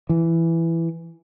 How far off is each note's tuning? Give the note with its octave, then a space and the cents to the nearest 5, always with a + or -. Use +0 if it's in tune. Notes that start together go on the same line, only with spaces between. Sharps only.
E3 +10